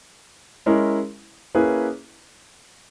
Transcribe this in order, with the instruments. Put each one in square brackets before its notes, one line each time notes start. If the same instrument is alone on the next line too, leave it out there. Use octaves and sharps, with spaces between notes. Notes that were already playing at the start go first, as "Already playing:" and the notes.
[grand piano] G#3 C#4 E4 A#4
A#3 C#4 E4 G#4 B4